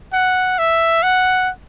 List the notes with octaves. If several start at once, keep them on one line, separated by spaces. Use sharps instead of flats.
F#5
E5
F#5